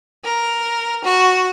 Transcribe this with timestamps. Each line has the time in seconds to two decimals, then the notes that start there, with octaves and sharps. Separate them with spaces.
0.23 A#4
1.03 F#4